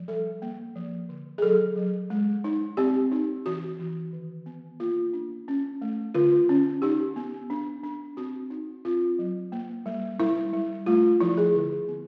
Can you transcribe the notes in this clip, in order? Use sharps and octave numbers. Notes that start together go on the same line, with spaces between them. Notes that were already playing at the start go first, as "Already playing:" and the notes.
Already playing: F3
G3 A4
A#3
F3
D3
G#4
F#3 A4
F#3
G#3
D#4
C4 G4
D#4
E3 F#4
E3
D#3
B3
A#3 F4
D4
C#4
A3
D3 F4
C#4
D#4 G4
B3
D4
D4
C4 F#4
D#4
C4 F4
F#3
A#3
G3
G3 E4
G3
A3 F4
F3 E4
G#4
D3
B3